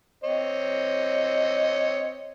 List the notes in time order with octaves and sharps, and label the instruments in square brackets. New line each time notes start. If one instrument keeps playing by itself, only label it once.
[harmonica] C4 C#5 D#5